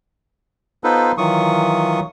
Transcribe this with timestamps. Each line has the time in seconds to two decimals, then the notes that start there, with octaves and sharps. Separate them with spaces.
0.84 B3 D#4 F4 A4 B4 C5
1.18 D#3 E3 F#3 F4 C#6 D#6